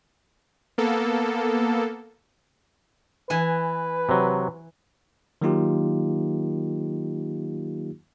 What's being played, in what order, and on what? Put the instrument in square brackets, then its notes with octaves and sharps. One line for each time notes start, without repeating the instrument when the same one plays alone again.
[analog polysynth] A#3 B3 A4
[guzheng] E3 G#5 [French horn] B4
[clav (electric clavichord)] C3 F#3
[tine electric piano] D#3 F#3 A#3 D#4 F4 G4